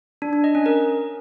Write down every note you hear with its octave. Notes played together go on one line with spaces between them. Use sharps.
D4
D4
D#5
C#4
A#4